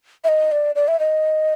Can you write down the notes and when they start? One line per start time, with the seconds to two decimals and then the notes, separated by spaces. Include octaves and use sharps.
0.24 E5
0.28 D#5
0.52 D5
0.75 D5
0.88 E5
0.99 D#5